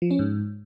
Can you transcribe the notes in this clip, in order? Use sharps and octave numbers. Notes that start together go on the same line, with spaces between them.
F3
C#4
G#2